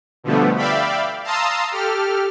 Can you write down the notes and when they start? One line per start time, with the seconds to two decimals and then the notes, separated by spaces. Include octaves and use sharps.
0.24 B2 D3 F3 G3 A3 B3
0.56 D5 E5 F5 G5 B5
1.24 F5 A5 A#5 C6 D#6 E6
1.72 G4 A4 F6